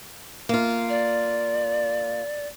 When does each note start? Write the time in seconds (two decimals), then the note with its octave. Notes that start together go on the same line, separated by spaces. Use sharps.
0.49 A#3 F4
0.89 D5